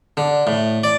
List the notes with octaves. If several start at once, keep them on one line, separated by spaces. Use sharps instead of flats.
D3
A2
D5